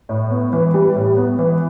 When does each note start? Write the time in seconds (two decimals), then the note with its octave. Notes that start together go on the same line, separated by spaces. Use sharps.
0.09 A2
0.30 B3
0.53 E3
0.74 G3
0.95 A2
1.17 B3
1.39 E3